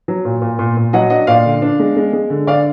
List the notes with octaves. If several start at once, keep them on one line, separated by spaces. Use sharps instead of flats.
F#3
A#2
A#2
A#2
A#2
F#3 D#5 F#5
D4 D#5 F#5
A#2 D5 F5
D3
D4
G#3
G#3
G#3
D3
D3 D5 F5